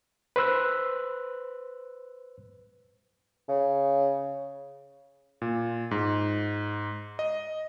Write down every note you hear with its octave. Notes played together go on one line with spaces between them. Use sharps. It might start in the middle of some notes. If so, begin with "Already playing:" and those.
B4 C5 E6 F#6
C#3
A#2
G#2
D#5